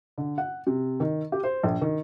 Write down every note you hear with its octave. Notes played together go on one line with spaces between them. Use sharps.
D3
F#5
C3
D#3
G4
C5
A#1
D#3